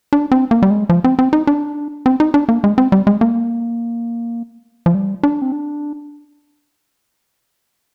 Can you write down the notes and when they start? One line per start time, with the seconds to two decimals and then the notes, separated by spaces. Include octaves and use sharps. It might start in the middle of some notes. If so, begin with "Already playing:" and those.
0.13 D4
0.32 C4
0.51 A#3
0.63 G3
0.70 G#3
0.89 F3
1.04 C4
1.19 C4
1.33 D#4
1.47 D4
2.06 C4
2.20 D#4
2.34 D4
2.49 A#3
2.64 G#3
2.78 C4
2.92 G3
3.07 G#3
3.21 A#3
4.86 F3
4.94 G3
5.23 D4
5.42 C4
5.52 D4